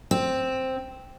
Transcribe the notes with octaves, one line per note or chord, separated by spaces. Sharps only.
C4